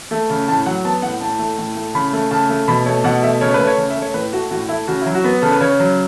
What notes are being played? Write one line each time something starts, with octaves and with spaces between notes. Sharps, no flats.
A3
C#3
A2 A5
F#3 F#5
B3 A5
A2 F#5
A2 A5
A3
A2
A3
C#3 B5
A3
C#3 A5
A3
B2 B5
A3 C#5
B2 F#5
A3 E5
C#3 C#5
B4
A3
C#5
C#3
E5
A3
C#5
A2 B4
A3 F#4
A2 F#4
A3 E4
C#3 F#4
F#3 E4
F#4
B3
C#3 A4
B4
C#3 C#5
F#3